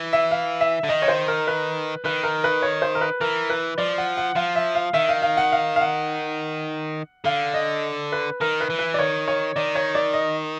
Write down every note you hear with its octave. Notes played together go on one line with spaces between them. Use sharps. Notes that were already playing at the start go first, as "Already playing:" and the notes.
Already playing: E3
E5
F5
E5
D3
D#3 D#5
C#5
C5
A#4
B4
D#3 B4
A#4
B4
C#5
C5
A#4
B4
E3 A#4
B4
F3 D5
F#5
F#5
F3 F5
E5
F5
D#3 E5
F5
F5
F#5
F5
F5
F#5
D3 F5
D#5
B4
D#3 A#4
B4
E3
B4
D5
D#3 C#5
C#5
D#3 D5
C#5
D5
D#5